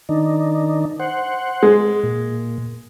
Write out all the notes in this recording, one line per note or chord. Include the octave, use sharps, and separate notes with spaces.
D#3 D4 D#4
C5 F#5
G#3
A#2